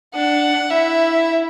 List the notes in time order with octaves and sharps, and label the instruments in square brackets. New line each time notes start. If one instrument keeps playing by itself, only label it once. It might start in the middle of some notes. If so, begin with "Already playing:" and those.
[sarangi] D4 [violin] F#5
[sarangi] E4 [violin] E5